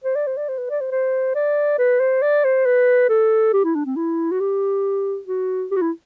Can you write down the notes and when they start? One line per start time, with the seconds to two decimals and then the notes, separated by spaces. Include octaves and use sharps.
0.04 C5
0.15 D5
0.27 C5
0.37 D5
0.48 C5
0.58 B4
0.70 D5
0.80 C5
0.91 C5
1.35 D5
1.78 B4
2.00 C5
2.22 D5
2.44 C5
2.66 B4
3.09 A4
3.53 G4
3.64 E4
3.75 D4
3.86 C4
3.96 E4
4.32 F#4
4.40 G4
5.27 F#4
5.71 G4
5.76 F#4
5.82 E4